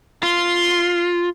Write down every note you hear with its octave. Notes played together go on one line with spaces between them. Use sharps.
F4 C6